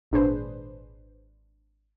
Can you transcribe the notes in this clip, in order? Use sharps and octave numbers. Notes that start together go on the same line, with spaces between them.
G#1 A#2 D4 G#4 B4 C5